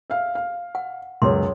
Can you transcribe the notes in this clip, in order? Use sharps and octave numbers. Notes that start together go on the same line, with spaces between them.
E5 F5
F5
F#5
C#2 F#2 C#5 C6